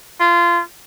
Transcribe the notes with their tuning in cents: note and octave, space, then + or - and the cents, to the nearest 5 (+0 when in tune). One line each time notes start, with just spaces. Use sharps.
F4 -20